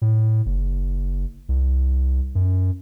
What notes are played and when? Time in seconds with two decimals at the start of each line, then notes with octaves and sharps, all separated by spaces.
0.02 A2
0.46 F#1
1.49 C2
2.35 F#2